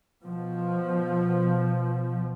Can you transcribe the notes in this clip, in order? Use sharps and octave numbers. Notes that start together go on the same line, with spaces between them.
B2 F3